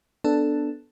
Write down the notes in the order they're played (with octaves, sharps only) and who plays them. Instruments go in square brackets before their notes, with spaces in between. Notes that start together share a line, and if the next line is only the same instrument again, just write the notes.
[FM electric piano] B3 D4 A4